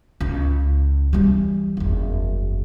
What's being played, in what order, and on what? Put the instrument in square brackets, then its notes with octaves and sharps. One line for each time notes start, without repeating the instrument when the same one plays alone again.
[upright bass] C#2
E3 G3
F#1 E2